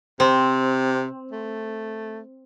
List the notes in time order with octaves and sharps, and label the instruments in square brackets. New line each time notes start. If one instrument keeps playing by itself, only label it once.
[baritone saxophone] C3 [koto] C4
[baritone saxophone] A3